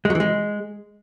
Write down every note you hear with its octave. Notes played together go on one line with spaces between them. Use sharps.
G#3
F#3
E3
G#3